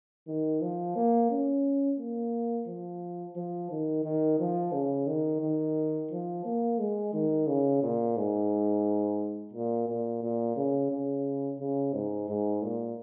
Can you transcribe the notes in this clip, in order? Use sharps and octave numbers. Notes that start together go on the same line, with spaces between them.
D#3
F3
A#3
C#4
A#3
F3
F3
D#3
D#3
F3
C#3
D#3
D#3
F3
A#3
G#3
D#3
C#3
A#2
G#2
A#2
A#2
A#2
C#3
C#3
C#3
G#2
G#2
A#2